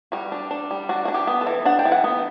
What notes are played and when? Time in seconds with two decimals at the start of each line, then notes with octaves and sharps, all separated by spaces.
0.12 G3 F#4
0.32 D4
0.51 D4
0.71 G3
0.89 D4 F#4
1.05 D4 F#4
1.14 G4
1.27 B3
1.41 A4
1.47 E3
1.65 D4 F#5
1.79 G5
1.85 E3
1.92 F#5
2.04 B3